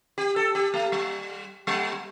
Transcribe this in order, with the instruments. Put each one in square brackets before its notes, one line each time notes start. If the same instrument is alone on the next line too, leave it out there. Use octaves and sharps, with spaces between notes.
[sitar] G4
A4
G4
A3
G3
G3